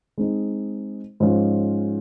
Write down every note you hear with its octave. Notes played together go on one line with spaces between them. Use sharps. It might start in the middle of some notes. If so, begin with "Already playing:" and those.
G#3 C4 D#4
G#2 F3 G#3 C#4 F4